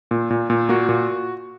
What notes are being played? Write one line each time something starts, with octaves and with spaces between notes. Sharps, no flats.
A#2
A#2
A#2
A#3 F#4
A#2